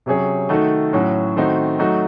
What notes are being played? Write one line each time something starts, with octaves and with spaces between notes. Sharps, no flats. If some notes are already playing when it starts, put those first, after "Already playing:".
C3 F#3 C#4 G#4 C#5
D#3 A3 D#4 F#4 A4
A2 F#3 C#4 F#4
D#3 A3 C4 D#4 F#4
F#3 A3 D#4 F#4